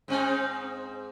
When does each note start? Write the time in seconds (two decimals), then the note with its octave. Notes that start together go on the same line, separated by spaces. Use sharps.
0.08 G#2 C4 D#4